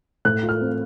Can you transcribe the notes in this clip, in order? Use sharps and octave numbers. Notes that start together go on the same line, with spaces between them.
A2 F#6
F4
F6
C4